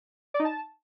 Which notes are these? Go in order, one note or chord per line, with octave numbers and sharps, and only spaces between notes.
D5
D#4
A5